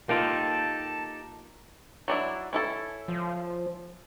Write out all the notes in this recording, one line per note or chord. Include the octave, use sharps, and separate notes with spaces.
A#3 D#4 F4 G4 A4 A5
F#3 D4 E4
C#4 E4 A4
F3